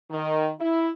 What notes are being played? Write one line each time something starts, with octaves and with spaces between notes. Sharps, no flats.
D#3
E4